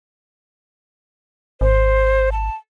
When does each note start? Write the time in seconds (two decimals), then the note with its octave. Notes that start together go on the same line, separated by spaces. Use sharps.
1.61 G#1 C5
2.32 A5